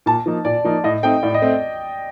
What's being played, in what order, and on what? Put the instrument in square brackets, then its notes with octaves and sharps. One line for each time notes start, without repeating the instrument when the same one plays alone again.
[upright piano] A#2 [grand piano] A5
[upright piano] F3 A#3 D#4
[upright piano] A#2 [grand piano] D5
[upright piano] F3 A#3 D#4
[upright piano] A2 [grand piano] D#5
[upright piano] A3 C4 D#4 [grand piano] G5
[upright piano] A2 [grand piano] D5
[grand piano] D#5
[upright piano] A3 C4